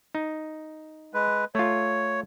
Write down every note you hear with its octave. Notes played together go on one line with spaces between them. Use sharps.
D#4
G#3 B4
A3 F4 C#5